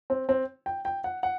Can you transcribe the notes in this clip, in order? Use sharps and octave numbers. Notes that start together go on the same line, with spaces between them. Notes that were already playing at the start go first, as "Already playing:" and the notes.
C4
C4
G5
G5
F#5
F#5